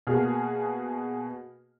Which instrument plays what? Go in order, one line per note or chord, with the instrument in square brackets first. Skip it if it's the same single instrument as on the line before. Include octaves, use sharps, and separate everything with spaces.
[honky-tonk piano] B2 A#3 F#4 G#4 F6